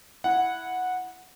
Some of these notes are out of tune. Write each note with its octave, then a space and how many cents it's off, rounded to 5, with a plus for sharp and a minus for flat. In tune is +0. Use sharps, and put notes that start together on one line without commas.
E4 +0 F#5 -10